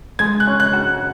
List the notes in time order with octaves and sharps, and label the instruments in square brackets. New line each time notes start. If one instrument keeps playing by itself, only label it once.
[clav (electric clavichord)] G#3 [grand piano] G#6
[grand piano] F#6
[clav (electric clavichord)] C#4
[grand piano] F#6
[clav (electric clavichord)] F#4